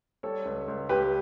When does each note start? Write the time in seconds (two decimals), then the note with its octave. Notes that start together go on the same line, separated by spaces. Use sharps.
0.23 G3 A4 C#5
0.45 C#2
0.68 C#2
0.89 C#2 G4 B4